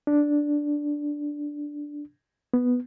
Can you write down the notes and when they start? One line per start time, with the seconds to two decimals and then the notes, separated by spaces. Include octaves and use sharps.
0.07 D4
2.54 B3